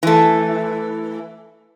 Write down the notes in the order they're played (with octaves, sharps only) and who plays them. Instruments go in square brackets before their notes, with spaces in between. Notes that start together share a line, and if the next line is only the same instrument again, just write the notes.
[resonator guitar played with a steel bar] E3 A3